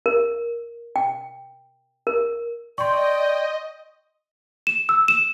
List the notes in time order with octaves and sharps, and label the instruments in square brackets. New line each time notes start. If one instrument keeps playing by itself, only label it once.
[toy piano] A#4
G5
A#4
[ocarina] D5 [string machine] D#5 [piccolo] G5 [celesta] C6 C#6
[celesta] E7
E6
E7